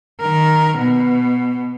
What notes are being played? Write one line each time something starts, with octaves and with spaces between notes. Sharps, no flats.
D#3 A#4
B2 B3